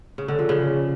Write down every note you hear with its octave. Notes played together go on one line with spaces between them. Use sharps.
C#3
D3
F3
C#3